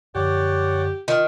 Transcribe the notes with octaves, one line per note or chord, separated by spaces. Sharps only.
F#2 D3 F3 G4 C#5 D5 F#5
D#3 F4